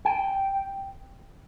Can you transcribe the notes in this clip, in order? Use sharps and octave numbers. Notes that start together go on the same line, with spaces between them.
G5